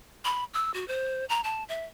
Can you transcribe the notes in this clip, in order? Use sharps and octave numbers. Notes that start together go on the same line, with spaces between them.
B5
E6
F#4
C5
A#5
A5
E5